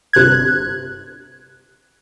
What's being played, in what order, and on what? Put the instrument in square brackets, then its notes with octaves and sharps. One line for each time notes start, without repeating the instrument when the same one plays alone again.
[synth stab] G1 C3 F#6 G#6